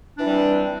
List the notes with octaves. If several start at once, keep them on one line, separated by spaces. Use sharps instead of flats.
E3 G3 C4 D4